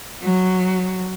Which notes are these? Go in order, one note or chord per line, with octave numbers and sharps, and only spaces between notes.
F#3